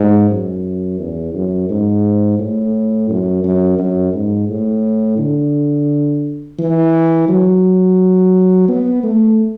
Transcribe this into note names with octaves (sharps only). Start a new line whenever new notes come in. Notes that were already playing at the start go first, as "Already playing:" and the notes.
Already playing: G#2
F#2
E2
F#2
G#2
A2
F#2
F#2
F#2
G#2
A2
D3
E3
F#3
B3
A3